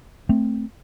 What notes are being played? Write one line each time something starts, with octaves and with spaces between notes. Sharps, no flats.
A3 C4